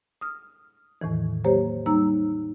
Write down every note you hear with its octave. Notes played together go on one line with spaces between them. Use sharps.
D#6 F6
E2 A2 D#3 E3
F#3 A#3 G4 C5 C#5
G3 A#3 D#4 A#5 E6